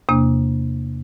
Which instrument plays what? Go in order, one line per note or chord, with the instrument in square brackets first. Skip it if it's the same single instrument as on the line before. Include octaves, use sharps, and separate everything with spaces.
[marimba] E2 C3 A#3 D4